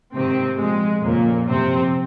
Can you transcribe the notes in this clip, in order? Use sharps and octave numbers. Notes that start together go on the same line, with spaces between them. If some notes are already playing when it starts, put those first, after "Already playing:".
G#2 C3 D#3 C4
A#2 F3 G#3
F2 A#2 C#3 F3 A#3
F#2 C3 F3 C4